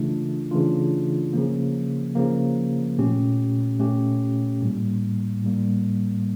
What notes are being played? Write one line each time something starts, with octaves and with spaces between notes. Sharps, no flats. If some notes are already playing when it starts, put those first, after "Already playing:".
Already playing: C#3 E3 A3 D4 F4
C#3 E3 A3 D4 F4
C#3 F3 A#3
C#3 F3 A#3
A#2 A3 C#4 G4
A#2 A3 C#4 G4
A2 G3 A#3
A2 G3 A#3